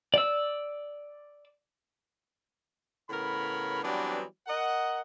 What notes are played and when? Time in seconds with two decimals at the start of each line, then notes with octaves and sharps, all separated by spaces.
0.14 D5 E6
3.10 A2 C#3 B3 A#4 C#5 B5
3.83 E3 F#3 G3 B3 C4 D4
4.48 A#4 D#5 F#5